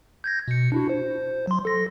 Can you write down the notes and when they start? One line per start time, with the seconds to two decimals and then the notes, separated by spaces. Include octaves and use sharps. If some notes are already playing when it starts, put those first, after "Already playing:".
0.24 G6 G#6 A#6
0.48 B2 C#7
0.72 D4 E4 F#4
0.89 C5
1.47 F#3 C6
1.65 A4 A#6